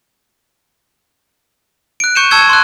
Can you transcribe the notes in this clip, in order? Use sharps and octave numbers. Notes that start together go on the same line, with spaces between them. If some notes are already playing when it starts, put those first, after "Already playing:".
F#6 D7
C#6 G6 C#7 D#7 E7
A5 C#6 E6 G#6 C#7 G7
C6 F#6